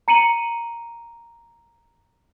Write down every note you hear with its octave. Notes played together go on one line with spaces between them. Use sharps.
A#5 C#7 D#7 F#7